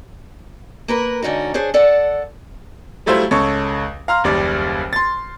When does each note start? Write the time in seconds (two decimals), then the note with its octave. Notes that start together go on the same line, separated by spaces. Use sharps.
0.88 A#3 A#4 B4
1.22 G#2 D3 C#4 D#4 F#4
1.54 D4 G#4 C5 C#5
1.74 A4 D5 F#5 A5
3.06 F#3 G3 A3 E4 F4 C5
3.31 C#2 A4 C#5 C#6
4.08 F5 A#5 C6 F6
4.24 F#1 D#2 G3 D5 D6
4.93 C6 A6